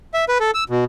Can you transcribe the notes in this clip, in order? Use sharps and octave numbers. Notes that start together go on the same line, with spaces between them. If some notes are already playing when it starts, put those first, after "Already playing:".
E5
B4
A4
E6
B2